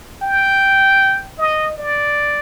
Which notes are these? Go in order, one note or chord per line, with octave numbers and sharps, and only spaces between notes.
G5
D#5
D5